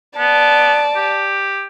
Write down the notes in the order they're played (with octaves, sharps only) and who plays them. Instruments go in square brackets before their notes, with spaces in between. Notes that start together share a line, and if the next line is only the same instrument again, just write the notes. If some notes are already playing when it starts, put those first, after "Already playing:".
[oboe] B3 [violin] D5 A5
[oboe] G4